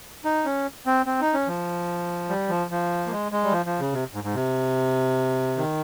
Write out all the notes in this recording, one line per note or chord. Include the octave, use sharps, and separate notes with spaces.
D#4
C#4
C4
C4
D#4
C#4
F3
G3
F3
F3
A#3
G#3
G#3
G3
F3
F3
C#3
C3
G#2
G#2
C3
D#3